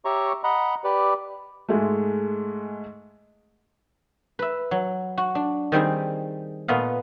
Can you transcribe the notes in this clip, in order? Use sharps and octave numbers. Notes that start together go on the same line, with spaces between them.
G4 C#5 E5 A#5 C#6
D#5 F#5 A#5 B5
G4 B4 D5
G#2 G#3 A3
B4 E5
F#3
F#4
D4
D#3 G3 C4 G#4
A#2 A3 B3 B4 D#5 F5